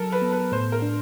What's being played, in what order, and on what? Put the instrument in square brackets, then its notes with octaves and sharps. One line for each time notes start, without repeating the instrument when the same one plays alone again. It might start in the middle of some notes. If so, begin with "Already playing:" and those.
Already playing: [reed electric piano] F#3 [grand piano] A4 A#4
[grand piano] B4
[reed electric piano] B3
[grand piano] B4
[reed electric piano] A2 [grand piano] C5
[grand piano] A#4
[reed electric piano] D4